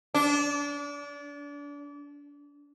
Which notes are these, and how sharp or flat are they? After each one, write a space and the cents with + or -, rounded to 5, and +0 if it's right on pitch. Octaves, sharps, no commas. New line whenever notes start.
D4 -30